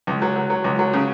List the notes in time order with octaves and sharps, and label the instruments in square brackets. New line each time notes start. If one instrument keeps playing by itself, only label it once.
[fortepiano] C#2
F#3
F#3
F#3
C#2
F#3
C#3